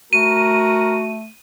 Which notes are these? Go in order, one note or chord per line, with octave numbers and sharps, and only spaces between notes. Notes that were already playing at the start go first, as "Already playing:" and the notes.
A3 F#4 A#4 D#7